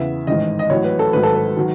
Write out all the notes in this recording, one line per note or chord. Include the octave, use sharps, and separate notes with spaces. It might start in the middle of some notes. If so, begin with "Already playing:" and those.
Already playing: E2 C#3 E3 B3 E5
A1 G#2 D#3 D#5
D#5
A1 A2 F#3 C#5
B4
A4
G#1 G#2 F#3 B4
A4
B4
D#3 F#3